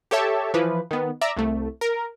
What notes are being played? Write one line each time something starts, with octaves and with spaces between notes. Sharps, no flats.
G4 A4 C#5 E5 A5
E3 F3 B4
D#3 B3
D5 E5 A#5
C2 A3
A#4